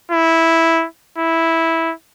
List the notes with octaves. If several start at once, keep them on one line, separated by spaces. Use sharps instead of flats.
E4
E4